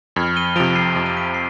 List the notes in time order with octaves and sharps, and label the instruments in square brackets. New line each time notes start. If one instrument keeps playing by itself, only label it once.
[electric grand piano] F2 [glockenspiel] F6 G#6
[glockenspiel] D#7 G7
[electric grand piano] F3 [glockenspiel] D7 F7
[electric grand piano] C3
[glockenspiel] C7 D#7
[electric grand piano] F2 [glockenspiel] D7
[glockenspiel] D#7
B6 D7
C7